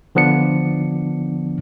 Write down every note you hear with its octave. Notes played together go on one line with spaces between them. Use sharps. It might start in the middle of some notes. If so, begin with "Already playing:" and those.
D3 F3 B3 D4 C#7